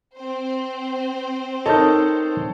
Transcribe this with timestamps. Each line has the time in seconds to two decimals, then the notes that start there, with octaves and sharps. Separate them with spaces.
0.15 C4 C5
1.66 D#4 A4 A#4 C#5 D#5 A5